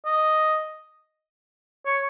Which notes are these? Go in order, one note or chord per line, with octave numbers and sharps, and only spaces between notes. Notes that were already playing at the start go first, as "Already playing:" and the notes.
D#5
C#5